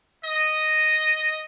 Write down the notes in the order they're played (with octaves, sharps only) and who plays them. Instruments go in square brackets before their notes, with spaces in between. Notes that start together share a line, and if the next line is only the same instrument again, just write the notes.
[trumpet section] D#5